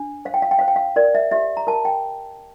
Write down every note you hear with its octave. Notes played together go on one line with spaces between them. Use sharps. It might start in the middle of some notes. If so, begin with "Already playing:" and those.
Already playing: D4
C5 F5
G5
F5
G5
C5 F5
G5
F5
A#4 D5
E5
G4 E5
A#5
A#4 A5
G5